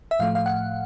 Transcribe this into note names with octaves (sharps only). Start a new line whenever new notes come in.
E5
A2 F3 A3 F5
F5
F#5